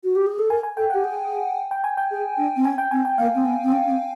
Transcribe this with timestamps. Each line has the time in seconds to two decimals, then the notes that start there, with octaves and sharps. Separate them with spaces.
0.04 F#4
0.15 G4
0.26 G#4
0.39 A4
0.50 A#4 G#5
0.63 G#5
0.77 A4 G5
0.90 G4 F#5
1.04 G#4
1.71 G5
1.84 G#5
1.97 G5
2.11 G#4
2.37 D4
2.56 C4
2.65 C#4 G#5
2.78 G5
2.91 C4 G#5
3.05 G5
3.18 A#3 F5
3.35 C4
3.45 B3
3.64 C4
3.72 C#4
3.85 C#4
3.90 C4